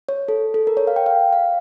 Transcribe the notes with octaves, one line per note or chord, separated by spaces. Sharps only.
C#5
A4
A4
A#4
C#5
F5
G5
F5
F5